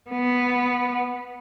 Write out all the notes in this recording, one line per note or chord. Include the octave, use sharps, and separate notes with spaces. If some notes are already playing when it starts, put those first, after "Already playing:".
B3